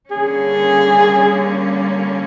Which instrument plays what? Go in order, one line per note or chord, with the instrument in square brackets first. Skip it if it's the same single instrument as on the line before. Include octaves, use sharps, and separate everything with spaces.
[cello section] D3 G3 A#3 C#4 [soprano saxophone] G#4